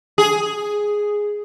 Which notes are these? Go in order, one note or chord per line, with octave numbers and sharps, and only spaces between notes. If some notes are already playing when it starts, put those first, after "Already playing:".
G#4